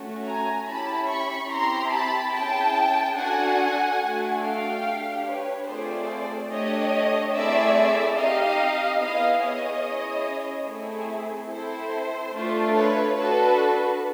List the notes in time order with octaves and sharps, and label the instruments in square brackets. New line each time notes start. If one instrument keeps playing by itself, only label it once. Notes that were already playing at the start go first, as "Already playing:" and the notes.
Already playing: [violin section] A3 C#4 F#4
G#5 A#5
C#4 E4 G4 A5 B5
B5 C#6
C4 E4 G4 A#5 C6
A5 B5
C#4 E4 G#4 G5 A5
D4 F#4 A4 F#5 G#5
A3 D4 F#4 A4
F5 G5
D4 G4
B4 C#5
A3 C4 F4 G#4 C5 D5
A3 D4 G4 C#5 D#5
A3 C4 E4 G#4 D5 E5
C4 D#4 G4 D#5 F5
B3 E4 G#4 D#5 F5
C#5 D#5
C#4 E4 G#4
A3 C4 E4 G#4
C4 E4 A4 C5
A3 D4 F4 A4
B4 C#5
D4 F#4 A4 B4